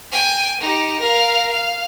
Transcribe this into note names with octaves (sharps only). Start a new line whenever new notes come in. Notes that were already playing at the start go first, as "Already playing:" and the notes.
G5 G#5
D#4 G4
A#4 F5
F5